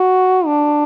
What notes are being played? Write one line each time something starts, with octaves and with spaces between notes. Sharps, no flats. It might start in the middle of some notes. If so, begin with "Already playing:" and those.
Already playing: F#4
D4